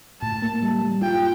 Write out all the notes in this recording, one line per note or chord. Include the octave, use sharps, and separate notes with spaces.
A2 A5
A#3
G3
G3
F4 G5